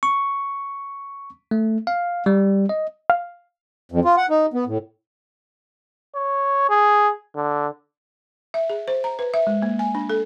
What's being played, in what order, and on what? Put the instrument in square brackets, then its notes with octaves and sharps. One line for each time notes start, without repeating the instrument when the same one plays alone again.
[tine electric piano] C#6
A3
F5
G3
D#5
[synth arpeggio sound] F5
[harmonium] F2
F4
F#5
D#4
B3
A2
[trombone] C#5
G#4
D3
[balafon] E5
G#4
C5
A#5
B4
E5
G#3
A#3
G#5
D4
A4